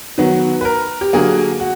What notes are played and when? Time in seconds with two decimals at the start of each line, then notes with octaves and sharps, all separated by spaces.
0.18 D#3 F#3 B3
0.61 B4
0.65 A#4
1.01 G4
1.13 D3 F#3 A#3 G#4
1.60 F#4